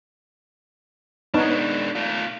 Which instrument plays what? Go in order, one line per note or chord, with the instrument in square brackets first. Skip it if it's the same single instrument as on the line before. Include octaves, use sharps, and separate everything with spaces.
[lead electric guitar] G#3 D4 [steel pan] B3 D#4 C#5
[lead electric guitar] A3 F4